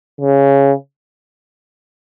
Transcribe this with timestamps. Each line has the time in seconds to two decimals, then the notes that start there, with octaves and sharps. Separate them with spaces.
0.21 C#3